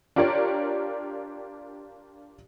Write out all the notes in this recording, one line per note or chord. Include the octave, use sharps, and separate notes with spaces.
D4 F4 G4 A#4 C#5 D5